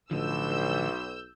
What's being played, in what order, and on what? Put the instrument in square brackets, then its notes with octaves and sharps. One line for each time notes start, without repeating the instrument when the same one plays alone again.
[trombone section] B1 [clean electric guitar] A2 D3 F3 [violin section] E6 G6